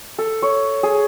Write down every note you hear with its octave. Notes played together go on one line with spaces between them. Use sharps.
A4
C#5
G#4